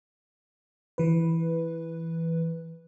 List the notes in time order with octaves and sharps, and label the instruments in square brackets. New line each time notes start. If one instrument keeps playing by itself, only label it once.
[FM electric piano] E3 B4